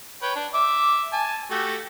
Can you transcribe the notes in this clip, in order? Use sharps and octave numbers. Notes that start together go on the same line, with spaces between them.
B4 C#5 G5
D4
E5 D6
G#5 A5
A3 F#4 G4